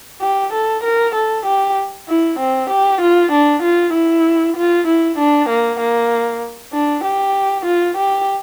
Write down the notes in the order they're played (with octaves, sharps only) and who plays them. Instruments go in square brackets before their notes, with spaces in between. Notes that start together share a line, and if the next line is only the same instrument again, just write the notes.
[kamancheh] G4
A4
A#4
A4
G4
E4
C4
G4
F4
D4
F4
E4
F4
E4
D4
A#3
A#3
D4
G4
F4
G4